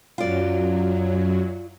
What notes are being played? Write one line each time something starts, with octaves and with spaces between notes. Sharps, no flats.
F#2 F#3 F4 D5